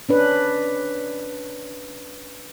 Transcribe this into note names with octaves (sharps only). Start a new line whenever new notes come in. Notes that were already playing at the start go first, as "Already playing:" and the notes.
C#4 D4 B4